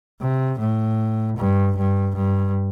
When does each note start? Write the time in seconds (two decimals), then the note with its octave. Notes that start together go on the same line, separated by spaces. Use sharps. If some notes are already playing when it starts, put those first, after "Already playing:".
0.20 C3
0.59 A2
1.37 G2
1.77 G2
2.16 G2